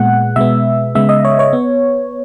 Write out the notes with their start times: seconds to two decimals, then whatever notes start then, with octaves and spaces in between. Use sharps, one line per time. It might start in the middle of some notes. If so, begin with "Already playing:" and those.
Already playing: A#2 G#3 B3 F#5
0.36 B2 G#3 B3 E5
0.95 C#3 G#3 B3 E5
1.09 D#5
1.25 C#5
1.39 C#5
1.53 B3